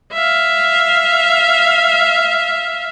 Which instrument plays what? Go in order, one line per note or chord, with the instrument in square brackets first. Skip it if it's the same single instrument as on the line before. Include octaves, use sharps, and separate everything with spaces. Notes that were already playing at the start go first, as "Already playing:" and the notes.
[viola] E5 F5